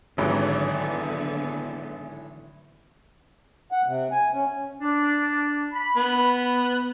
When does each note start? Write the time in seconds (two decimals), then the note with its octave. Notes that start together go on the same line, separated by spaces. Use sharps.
0.18 G#1 A2 D3 E3 F#3 B3
3.72 F#5
3.87 C3
4.12 G#5
4.33 C#4
4.81 D4
5.73 B5
5.96 B3